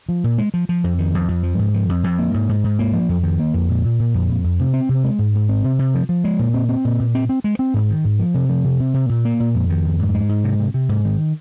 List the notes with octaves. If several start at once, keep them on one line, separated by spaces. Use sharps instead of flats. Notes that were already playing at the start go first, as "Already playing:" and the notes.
F3
A#2
G#3
F3
F3
F2
D#3
F2
F2
F3
G#2
F3
F2
F2
A#3
G#2
G#2
G#2
A#3
F3
F2
D#3
A#3
F2
A#2
A#2
A#2
F2
F2
F2
C3
C4
C3
G#3
G#2
G#2
C4
C3
C3
F3
F3
G#3
A#2
C4
C4
A#2
A#2
C4
C4
G#3
C4
G#2
D#3
G#2
F3
C3
F3
C3
C3
C3
A#2
A#3
A#2
F2
D#3
F2
G#2
G#3
G#2
C3
C3
C3
G#2
D#3